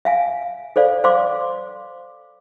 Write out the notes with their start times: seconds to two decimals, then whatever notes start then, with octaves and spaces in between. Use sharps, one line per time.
0.05 E5 F5 G#5
0.76 A4 C5 D5 F5
1.04 C5 F5 C6 D6